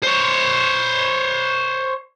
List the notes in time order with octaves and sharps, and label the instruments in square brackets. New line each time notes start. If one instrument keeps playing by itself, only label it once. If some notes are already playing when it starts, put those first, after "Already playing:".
[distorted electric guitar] C5 C#5